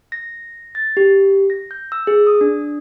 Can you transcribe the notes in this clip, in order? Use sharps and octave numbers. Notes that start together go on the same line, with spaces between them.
A#6
A6
G4
A#6
G6
E6
G#4
D#6
D4